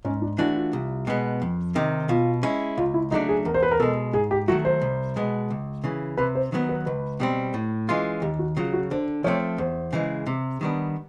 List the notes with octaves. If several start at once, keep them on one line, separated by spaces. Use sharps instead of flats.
G#2 C#4
D4
E3 A3 D4 E4 F#4
F4
C2
B2 G#3 B3
F2
C3 D#3
B2 F4
G#3 C#4 E4
C#2 F4
E4
C#3 F#3 A3 D4 D#4
G#4
E2 A#4
C5
B4
A#4
B2 G#3 A4
G#2 G#4
G4
D#3 F#3 A3 F#4
C5
C2
B2 G#3 B3
C#2
C#3 E3
C3 B4
C5
D#3 F#3 B3
B4
C#2 B4
B2 G3 C4
A2
E3 G#3 C#4 F4
D#2 G4
F#4
C#3 F#3 F4
F#4
D3 C5
F3 A3 C4 C#5
E2 C5
C#3 E3 G#3
C3
D#3 G3 B3 D4